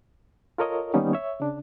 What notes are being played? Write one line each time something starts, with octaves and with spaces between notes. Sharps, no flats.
F4 A4 A#4 C#5 D#5
D#3 G3 A#3 B3 C#4 D#4
C#5 E5
C#3 D4